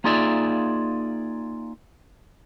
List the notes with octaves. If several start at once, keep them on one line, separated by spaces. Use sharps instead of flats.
A#3 D#4 F4 G#4 D5 E5